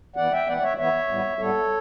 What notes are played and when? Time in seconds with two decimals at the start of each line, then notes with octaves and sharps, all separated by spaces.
0.16 E3 B3 D5 F#5
0.32 E5 G5
0.47 E3 B3 D5 F#5
0.57 D5
0.62 C#5 E5
0.77 E3 B3 C#5 E5
1.08 A2 G3 B3
1.38 A2 G3 B3 A4 C#5